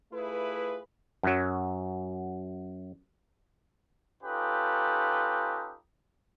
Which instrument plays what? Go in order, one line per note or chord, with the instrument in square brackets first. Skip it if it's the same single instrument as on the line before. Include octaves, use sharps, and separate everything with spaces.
[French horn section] A3 E4 F4 G#4 B4
[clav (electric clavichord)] F#2 F#3
[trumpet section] C#4 D#4 F4 G4 A4 B4